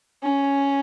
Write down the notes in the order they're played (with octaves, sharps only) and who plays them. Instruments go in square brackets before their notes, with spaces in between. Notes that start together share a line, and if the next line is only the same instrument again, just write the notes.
[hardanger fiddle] C#4